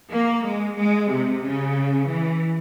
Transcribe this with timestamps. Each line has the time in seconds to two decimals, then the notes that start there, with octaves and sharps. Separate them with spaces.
0.13 A#3
0.45 G#3
0.78 G#3
1.10 C3
1.43 C#3
2.08 E3